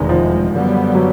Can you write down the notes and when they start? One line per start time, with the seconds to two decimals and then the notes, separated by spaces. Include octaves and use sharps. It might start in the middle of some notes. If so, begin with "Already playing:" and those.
Already playing: F1 E2 B2 D#3 G#3
0.09 F3
0.52 F#2 D3 G3 B3
0.95 F#3